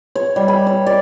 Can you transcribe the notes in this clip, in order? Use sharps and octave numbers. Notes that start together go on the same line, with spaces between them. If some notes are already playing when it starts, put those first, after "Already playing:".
C#5
G3
B5
C#5
D5